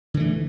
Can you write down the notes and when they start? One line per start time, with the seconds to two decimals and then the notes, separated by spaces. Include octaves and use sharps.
0.14 D3
0.17 E3
0.20 A3